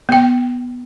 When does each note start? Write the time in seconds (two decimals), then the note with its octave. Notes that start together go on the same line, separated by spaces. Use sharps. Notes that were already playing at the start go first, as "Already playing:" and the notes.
0.09 B3 G5